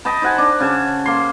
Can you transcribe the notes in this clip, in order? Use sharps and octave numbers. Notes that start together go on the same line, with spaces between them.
D#5 G5 A5 B5
D#4 C5 F#5 G#5
D4
C#3 G#5 A5
A#3 C6